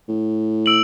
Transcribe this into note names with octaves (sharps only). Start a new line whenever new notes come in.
A2
E6 D7 F#7